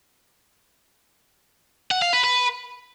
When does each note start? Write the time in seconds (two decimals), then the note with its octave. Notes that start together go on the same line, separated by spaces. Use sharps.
1.91 F#5
2.02 F5
2.13 B4
2.24 B4